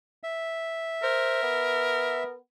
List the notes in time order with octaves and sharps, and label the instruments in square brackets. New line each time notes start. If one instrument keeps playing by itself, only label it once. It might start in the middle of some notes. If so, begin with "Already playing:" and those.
[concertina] E5
[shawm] A#4 [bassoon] C5
[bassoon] B3